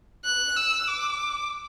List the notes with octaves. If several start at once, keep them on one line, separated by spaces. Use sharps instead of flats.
F#6
E6
D6